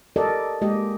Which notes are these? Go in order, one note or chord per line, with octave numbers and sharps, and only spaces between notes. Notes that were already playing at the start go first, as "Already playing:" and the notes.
G4 A4 A#4 D5 D#5
G#3 A#3 G4 D#5